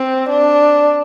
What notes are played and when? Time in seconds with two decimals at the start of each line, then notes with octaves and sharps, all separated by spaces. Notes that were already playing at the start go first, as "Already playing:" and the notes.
Already playing: C4
0.29 D4